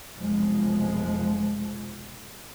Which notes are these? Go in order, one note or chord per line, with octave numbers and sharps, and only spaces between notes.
F1 B1 F3 G#3